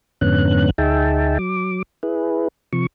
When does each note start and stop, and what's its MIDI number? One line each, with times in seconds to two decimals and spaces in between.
0.21 0.70 41
0.21 0.70 44
0.21 0.70 50
0.21 0.70 59
0.21 0.70 61
0.21 0.70 90
0.78 1.38 38
0.78 1.38 63
0.78 1.38 68
0.78 1.38 76
0.78 1.38 79
0.78 1.38 81
1.39 1.82 54
1.39 1.82 86
2.03 2.48 64
2.03 2.48 68
2.03 2.48 71
2.73 2.87 48
2.73 2.87 53
2.73 2.87 85